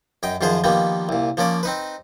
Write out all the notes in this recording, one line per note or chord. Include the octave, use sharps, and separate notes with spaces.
F#2 D#5 G5
F#2 D#3 F3 F4 G#4 C5
D#3 F3 G3 A#3 B3
C2 A#2
F3 A#3 C#4 D5
C4 D#4 B4